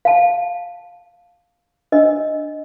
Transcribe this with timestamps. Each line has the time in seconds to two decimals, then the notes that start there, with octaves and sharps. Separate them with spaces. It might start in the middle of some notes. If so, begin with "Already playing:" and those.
0.05 F5 A5
1.92 D4 D#5 E6